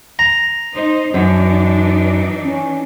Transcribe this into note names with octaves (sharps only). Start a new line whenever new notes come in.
A#5
D#4 C5 D#5
F#2 E3 D4 D#4
C#4